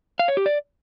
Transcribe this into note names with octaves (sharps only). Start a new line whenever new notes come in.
F5
C#5
G4
D5